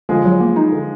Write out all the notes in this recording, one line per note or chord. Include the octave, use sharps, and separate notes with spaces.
D3 F3 G#3
F#3
A#3
D#4
D3